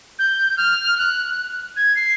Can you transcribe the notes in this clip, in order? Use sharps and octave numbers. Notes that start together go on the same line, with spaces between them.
G6
F6
F#6
G#6
C7